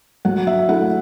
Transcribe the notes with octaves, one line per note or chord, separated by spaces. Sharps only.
F#3 F#5
E5
A3 E4 F#5